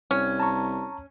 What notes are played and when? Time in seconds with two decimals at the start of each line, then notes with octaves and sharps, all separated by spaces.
0.11 C2 C#4
0.40 A5 A#5 C#6